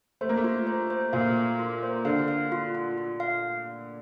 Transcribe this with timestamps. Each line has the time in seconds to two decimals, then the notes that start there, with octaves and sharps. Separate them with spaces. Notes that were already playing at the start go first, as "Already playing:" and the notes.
0.21 A3 C5
0.29 A#3
0.37 A3
0.44 F4
0.67 C5
0.90 C5
1.13 A#2 F5
1.37 F5
1.59 F4
1.83 C5
2.05 D3 F5
2.28 F5
2.52 F4
2.75 F4
2.98 F4
3.20 F5